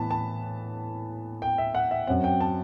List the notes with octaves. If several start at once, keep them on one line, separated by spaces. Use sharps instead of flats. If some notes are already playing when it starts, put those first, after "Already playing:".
Already playing: A2 E3 B3 A5 B5
A5
G5
E5
F#5
E5
F#2 F#3 C4 F#5
G5
A5